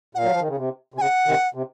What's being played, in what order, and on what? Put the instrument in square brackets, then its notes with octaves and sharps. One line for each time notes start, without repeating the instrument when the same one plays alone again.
[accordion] A#2 [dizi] F#5
[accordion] F#3 [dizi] F5
[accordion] F3
D#3
C#3
C3
C3
[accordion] C#3 [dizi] F#5 G#5
[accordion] C3 D#3
C3